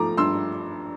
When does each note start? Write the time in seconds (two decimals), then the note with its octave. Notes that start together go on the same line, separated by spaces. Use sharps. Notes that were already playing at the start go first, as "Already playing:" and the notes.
Already playing: F3 A3 A#5 D6
0.17 G2 C6 E6